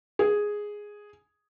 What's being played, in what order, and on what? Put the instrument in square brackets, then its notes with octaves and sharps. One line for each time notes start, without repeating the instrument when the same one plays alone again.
[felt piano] G#4